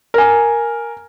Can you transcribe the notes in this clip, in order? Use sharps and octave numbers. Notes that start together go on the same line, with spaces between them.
A#4 G#5